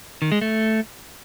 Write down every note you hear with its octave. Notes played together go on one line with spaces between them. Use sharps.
D#3
G#3
A3